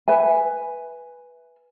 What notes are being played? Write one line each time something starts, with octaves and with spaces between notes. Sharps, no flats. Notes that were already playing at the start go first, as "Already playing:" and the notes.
B4 E5 G#5